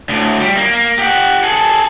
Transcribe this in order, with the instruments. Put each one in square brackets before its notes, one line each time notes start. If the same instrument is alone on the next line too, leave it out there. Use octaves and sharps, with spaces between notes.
[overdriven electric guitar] D2 A2
G3
A#3
G4 F#5
G#4 A4